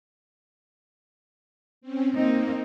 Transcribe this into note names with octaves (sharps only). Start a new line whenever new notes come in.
C4 C#4
A#3 C4 D#4